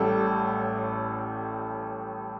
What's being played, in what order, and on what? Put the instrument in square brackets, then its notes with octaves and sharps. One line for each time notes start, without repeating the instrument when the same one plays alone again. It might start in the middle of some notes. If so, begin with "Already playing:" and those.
Already playing: [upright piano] A1 A2 G3 A4